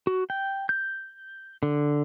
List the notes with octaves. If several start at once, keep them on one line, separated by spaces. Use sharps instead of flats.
F#4
G5
G6
D3